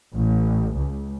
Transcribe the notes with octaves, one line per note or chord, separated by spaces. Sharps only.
A1
C#2